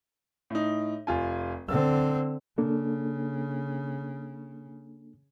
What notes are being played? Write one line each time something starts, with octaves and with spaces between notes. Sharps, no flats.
A2 D#4
F1 F4 G#5
D3 C4 E6
C#3 A#3 D4 A4